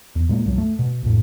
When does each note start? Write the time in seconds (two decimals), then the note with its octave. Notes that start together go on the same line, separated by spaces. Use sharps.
0.16 E2
0.29 A#2 G#3 A#3
0.46 C2 F#2 F#3
0.58 A3
0.79 B2
1.03 A#1 F2 A2